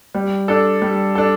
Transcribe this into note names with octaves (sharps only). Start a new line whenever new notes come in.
G3
D4 A4
G3
D4 A4